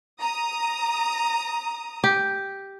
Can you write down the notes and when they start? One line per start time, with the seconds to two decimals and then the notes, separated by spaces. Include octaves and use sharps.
0.20 A#5 D#6
2.04 G4